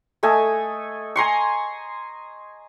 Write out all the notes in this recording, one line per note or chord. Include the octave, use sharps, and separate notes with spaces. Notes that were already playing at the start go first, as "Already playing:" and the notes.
A3 A4 D#5 G#5
G#5 A#5 C6 C#6